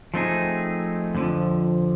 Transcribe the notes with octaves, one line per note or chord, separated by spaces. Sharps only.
F3 A3 C4 D#4 G#4
F2 D3 F3